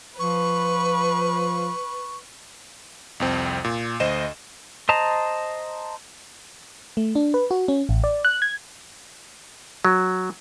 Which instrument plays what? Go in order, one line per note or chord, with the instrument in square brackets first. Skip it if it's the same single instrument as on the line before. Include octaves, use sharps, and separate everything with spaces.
[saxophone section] F3 [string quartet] B4 [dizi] C#6
[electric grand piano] C2 F2 C4
A#2
D2 C5 D#5 E7
[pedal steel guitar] C5 D#5 A5 A#5
[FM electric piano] A3
D4
B4
F#4
C#4
A1
D5
F#6
G#6
[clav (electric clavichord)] F#3